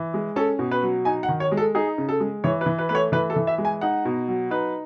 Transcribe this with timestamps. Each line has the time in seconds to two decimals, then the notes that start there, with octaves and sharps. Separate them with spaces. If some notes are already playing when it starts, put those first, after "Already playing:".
Already playing: E3
0.14 G#3
0.36 C#4 A4
0.59 B2
0.71 B4
0.83 F#3
1.05 D#4 G#5
1.23 F#5
1.28 D#3
1.40 C#5
1.52 G#3
1.57 A4
1.75 D#4 G#4
1.98 C#3
2.09 A4
2.20 G#3
2.44 E3 C#5
2.61 B4
2.66 E3
2.79 B4
2.89 A3 B4
2.95 C#5
3.12 E3 B4
3.30 A4
3.36 E3
3.47 E5
3.58 G#3
3.65 G#5
3.81 D#4 F#5
4.05 B2
4.28 F#3
4.51 D#4 B4